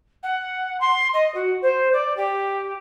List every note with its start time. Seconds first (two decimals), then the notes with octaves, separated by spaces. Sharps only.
0.23 F#5
0.80 C6
1.13 D#5
1.34 F#4
1.62 C5
1.93 D5
2.17 G4